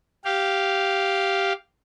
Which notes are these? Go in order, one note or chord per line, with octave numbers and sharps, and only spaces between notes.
G4 F5